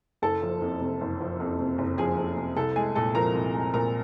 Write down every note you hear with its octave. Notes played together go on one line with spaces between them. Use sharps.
F#1 A4 A5
F3
F2
C3
F#1
F3
F2
C3
F#1
F3 G#4 G#5
F2
C3
C2 A4 A5
G#3 G#4 G#5
A#2 A4 A5
F3 A#4 A#5
C2
G#3
A#2 A#4 A#5